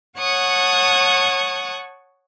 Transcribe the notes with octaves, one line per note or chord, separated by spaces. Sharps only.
C#5 F#5 A5 C#6 D#6 F#6